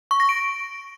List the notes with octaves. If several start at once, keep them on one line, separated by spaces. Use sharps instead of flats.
C#6
A#6
D7